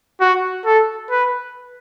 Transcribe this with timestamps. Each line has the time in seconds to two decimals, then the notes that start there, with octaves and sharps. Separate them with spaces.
0.21 F#4
0.65 A4
1.11 B4